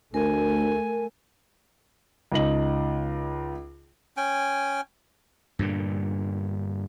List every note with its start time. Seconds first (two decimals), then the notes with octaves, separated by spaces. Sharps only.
0.14 D2 A3 A#4 G#5
2.32 C#2 D#4 D#5 F#7
4.17 C#4 G5 G#5
5.59 G2 A#2 D3